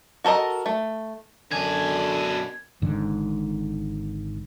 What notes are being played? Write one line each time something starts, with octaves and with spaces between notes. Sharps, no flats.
F#4 A4 A#4 D#5
A3
F#2 B2 D3 D4 G#5 G#6
G#1 G#2 D3